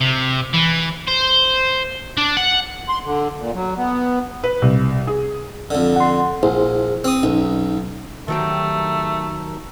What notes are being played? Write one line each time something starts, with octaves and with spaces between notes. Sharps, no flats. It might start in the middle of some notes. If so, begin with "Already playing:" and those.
C3
E3
C5
D4
F#5
C6
D3
A#2
F#3
B3
B4
C2
G#4
F2 D3
F#5 C6
A#1 E4 G#4 C5
C4 D#6
B1 C#4 D#4
D#3 F#3 A3 G4